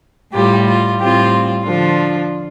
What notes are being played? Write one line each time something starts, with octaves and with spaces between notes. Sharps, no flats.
A2 G3 F4 G4
F4
A2 G3 C4 F4 G4
D3 F3 D4 F4